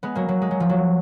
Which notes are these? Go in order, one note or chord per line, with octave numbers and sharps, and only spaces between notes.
G#3 B3
F#3 A#3
F#3
G#3
F#3
F3
F#3